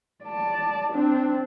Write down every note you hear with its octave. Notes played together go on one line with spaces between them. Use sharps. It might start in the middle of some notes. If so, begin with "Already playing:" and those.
D5 A5
C4 D4